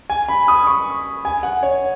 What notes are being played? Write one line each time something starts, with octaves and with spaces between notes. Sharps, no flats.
G#5
B5
D#6
C#6
G#5
F#5
C#5